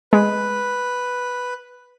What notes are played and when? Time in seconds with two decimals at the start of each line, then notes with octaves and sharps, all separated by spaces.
0.13 G#3 B4